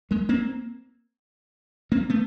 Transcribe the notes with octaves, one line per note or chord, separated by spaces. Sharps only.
G#3 A#3
A#3 C4
A#3 C4
A3 B3